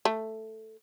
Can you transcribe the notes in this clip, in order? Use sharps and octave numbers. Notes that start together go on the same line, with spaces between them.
A3